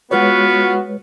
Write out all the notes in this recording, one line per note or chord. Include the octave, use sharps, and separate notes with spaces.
G#3 B3 F4 F#4 B4 C#5